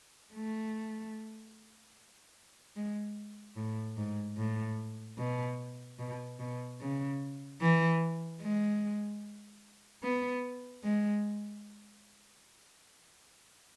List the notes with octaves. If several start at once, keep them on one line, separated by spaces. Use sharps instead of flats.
A3
G#3
A2
G#2
A2
B2
B2
B2
C#3
E3
G#3
B3
G#3